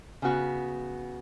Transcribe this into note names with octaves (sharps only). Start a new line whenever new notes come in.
C#3 B3 F#4